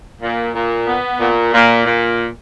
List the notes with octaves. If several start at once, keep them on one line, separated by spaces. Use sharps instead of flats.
A#2
A#2
B3
A#2
A#2
A#2